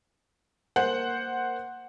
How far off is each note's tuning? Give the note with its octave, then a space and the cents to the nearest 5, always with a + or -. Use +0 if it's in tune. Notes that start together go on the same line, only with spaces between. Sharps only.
A#3 +0 C5 +0 F#5 +0